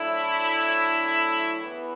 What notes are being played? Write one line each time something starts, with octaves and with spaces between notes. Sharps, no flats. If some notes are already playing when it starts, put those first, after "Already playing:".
Already playing: A2 F#3 A3 D4 E4
E2 E3 B3